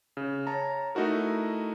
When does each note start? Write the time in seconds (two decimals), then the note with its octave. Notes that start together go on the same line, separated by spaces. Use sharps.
0.17 C#3
0.47 C#5 A5 A#5
0.95 A3 D#4 E4 F#4 A#4